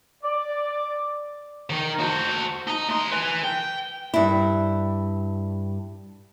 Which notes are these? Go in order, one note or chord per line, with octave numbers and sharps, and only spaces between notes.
D5
D#3
F#4 C5
D#4
A3 C6
B4 G#5
G5
G2 E4